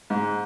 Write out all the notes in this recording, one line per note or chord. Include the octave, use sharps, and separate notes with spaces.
G#2